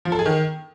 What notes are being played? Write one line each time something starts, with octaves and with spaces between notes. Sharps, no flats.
F3
A4
G#4
D#3